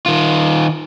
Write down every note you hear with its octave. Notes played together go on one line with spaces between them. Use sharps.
D#3 F4